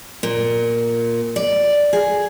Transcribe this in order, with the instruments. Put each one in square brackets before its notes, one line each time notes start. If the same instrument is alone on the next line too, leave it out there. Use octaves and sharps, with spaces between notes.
[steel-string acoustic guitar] A#2
D5
G#4